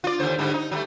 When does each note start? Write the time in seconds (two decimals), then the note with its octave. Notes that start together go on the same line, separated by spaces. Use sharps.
0.04 F4 D5
0.20 D#2 D3 C5
0.38 G#2 D3 G3
0.54 D#4
0.72 F#3 G3 A3